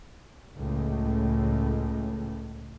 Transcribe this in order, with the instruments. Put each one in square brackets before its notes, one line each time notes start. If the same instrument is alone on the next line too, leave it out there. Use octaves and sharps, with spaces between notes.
[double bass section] C#2 A2